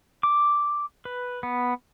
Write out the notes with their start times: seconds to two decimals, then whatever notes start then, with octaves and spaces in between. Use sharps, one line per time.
0.23 D6
1.05 B4
1.43 B3